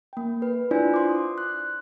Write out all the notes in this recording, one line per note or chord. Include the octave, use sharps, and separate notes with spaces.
A#3 G5
B4
D4 E4 F4 C5 D5 G#5
C6 D6
D#6
F#6